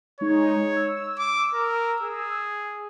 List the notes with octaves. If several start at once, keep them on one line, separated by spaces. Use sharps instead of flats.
G#3 D#4 C#5
E6
D6
A#4
G#4